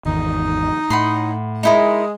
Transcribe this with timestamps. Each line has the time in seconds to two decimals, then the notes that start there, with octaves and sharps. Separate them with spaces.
0.06 G#1 E2 D#3 D#4
0.90 A2 F#5 B5 C6
1.63 G#3 D#4 E4 A#4